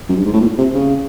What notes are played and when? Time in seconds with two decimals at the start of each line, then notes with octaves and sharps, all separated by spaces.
0.09 F#2
0.16 G2
0.25 G#2
0.33 A2
0.41 A#2
0.58 C3
0.74 C#3